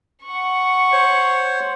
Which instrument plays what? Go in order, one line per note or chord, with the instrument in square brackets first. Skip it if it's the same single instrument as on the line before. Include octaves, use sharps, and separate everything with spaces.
[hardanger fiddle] F#5 C#6
[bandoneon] C5 C#5